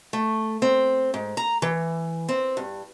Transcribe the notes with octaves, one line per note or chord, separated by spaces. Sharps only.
A3
C4
G#2
A#5
E3
C4
G2